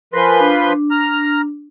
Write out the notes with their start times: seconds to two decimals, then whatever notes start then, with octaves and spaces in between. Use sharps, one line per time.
0.13 F3 A#4 B4 G#5 C6
0.40 D4
0.91 A#5 F6